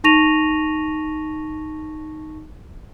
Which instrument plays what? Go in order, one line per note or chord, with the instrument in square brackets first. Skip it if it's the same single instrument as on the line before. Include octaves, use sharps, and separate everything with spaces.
[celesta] D#4 A5 C#6 A#6 D#7 F7